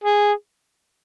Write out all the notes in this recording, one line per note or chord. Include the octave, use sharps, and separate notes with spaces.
G#4